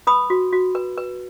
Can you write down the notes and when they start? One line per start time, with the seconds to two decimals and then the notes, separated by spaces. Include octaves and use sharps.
0.07 B4 B5 D#6
0.30 F#4
0.53 F#4
0.75 B4
0.98 B4